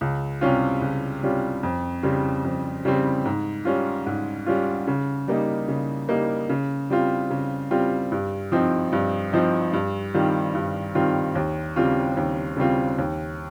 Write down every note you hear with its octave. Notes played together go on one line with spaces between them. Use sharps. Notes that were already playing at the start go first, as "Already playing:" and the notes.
C#2
C3 G3 C#4 F4
C#2
C3 G3 C#4 F4
F2
C#3 G3 C4
F2
C#3 G3 C4
G#2
G3 C#4 F4
G#2
G3 C#4 F4
C#3
G3 A#3 D#4
C#3
G3 A#3 D#4
C#3
G3 C4 F4
C#3
G3 C4 F4
G2
F3 C4 D#4
G2
F3 C4 D#4
G2
D#3 G3 C4 F4
G2
D#3 G3 C4 F4
D#2
C#3 G3 C4 F4
D#2
C#3 G3 C4 F4
D#2